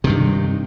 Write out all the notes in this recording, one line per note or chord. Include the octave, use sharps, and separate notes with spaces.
G2 C3 D#3